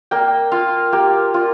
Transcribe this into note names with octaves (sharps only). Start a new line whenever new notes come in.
A#3 G5
F4 F5
A#3 G4
F4